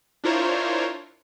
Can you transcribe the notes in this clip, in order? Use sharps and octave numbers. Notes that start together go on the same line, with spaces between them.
D4 E4 F4 A#4 C5 C#5